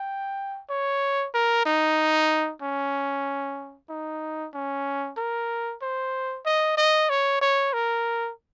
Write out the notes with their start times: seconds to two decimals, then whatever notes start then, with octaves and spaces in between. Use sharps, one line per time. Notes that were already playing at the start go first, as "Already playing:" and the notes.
Already playing: G5
0.70 C#5
1.34 A#4
1.66 D#4
2.62 C#4
3.90 D#4
4.54 C#4
5.17 A#4
5.82 C5
6.46 D#5
6.78 D#5
7.10 C#5
7.42 C#5
7.73 A#4